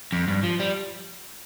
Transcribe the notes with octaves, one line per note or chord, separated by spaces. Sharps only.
F2
G2
F3
G3